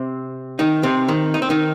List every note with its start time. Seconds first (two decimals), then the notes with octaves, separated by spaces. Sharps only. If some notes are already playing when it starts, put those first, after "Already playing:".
Already playing: C3 C4
0.59 D#3 D#4
0.83 C3 C4
1.09 D#3
1.34 D#4
1.42 C4
1.50 D#3 D#4